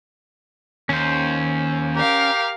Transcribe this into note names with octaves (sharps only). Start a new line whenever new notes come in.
D#2 C#4 C5
G4 A#4 F5